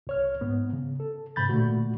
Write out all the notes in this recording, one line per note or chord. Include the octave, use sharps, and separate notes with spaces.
C2 C#5 F6
G#2 B3
C#3
A4
G#2 C#3 B5 G6 A6
A#2 D3 A3 F#4